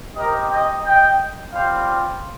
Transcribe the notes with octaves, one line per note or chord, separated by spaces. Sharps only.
C4 D#4 G4 A#4 D#5
D#5 G5
D#5 G5
G3 C4 F4 C5 F5